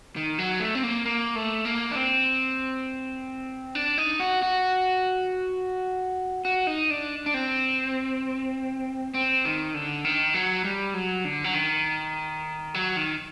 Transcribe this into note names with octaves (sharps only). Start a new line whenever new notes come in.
D#3
F#3
A3
C4
A#3
A#3
A3
A#3
D4
C4
D4
D#4
F#4
F#4
F#4
D#4
D4
D4
C4
C4
D#3
D3
D#3
F#3
G3
F#3
D3
F#3
D#3
F#3
D#3